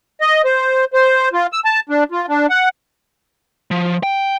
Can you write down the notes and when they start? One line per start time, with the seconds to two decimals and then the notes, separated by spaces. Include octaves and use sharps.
0.21 D#5
0.45 C5
0.93 C5
1.33 F4
1.52 E6
1.65 A5
1.89 D4
2.12 F4
2.28 D4
2.50 F#5
3.71 F3
4.03 G5